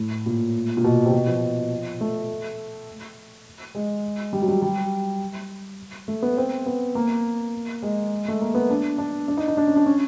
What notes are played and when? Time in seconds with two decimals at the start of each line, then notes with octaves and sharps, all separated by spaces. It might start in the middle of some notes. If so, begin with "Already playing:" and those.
Already playing: A2
0.26 A#2
0.77 A#2
0.84 B2
1.05 C3
1.12 B2
1.27 F3
2.01 A3
3.75 G#3
4.33 G3
4.42 F#3
4.48 G3
4.62 G3
6.08 A3
6.23 B3
6.37 C4
6.66 B3
6.95 A#3
7.83 G#3
8.28 A3
8.41 A#3
8.55 B3
8.70 D4
8.98 D4
9.28 D4
9.37 D#4
9.48 D#4
9.57 D4
9.67 C#4
9.76 D4
9.86 C#4